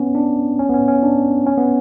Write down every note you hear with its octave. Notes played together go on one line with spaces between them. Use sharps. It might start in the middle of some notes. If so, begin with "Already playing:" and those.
Already playing: B3 C#4
D4
C#4
B3
C#4
C#4
D4
C#4
B3